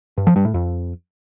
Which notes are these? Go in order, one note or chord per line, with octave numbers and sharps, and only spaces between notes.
G2
F3
G2
A2
F2